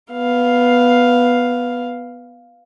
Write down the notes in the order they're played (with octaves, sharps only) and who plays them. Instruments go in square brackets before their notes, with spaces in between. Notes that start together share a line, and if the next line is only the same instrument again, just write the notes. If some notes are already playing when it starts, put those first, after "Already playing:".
[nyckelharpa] B3 F5